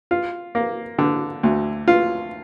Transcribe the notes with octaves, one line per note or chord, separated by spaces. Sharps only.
F4
A#3
D3
D2
F4